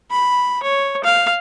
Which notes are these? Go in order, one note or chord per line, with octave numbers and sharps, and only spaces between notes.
B5
C#5
F5